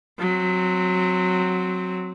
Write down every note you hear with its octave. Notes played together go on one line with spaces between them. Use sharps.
F#3 C4